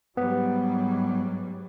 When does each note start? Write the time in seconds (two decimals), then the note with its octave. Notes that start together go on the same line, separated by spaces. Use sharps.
0.17 G#2 F#3 G3 B3